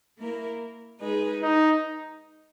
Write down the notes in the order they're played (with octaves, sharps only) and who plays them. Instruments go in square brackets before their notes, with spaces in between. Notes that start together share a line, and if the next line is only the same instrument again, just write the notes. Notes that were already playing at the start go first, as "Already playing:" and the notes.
[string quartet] A#3 E4 A#4
G#3 D#4 G#4 B4
[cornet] D#4